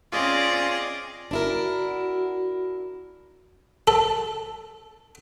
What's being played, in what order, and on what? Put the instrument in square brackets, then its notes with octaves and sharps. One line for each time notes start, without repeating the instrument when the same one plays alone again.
[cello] C4 C#4 [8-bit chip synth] F4 G#4 D#5 [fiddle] D5
[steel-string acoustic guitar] D4 E4 A#4 [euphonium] F#4
[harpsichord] A4